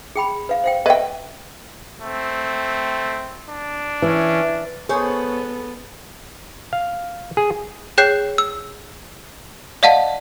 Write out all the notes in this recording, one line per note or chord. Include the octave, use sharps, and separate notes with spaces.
G#4 G5 B5
B4 F5
C5 F5 G5
B4 D#5 E5 G5
A3 C4
D4
E3 C#4
B3 G#4 A4 C5 C#5
F5
G#4
G#4 C#5 G5 F#6 G6 C7
E6
D5 D#5 F5 F#5 A5